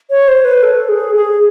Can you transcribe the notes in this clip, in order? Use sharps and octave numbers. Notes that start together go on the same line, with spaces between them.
C#5
C5
B4
A4
G#4
G#4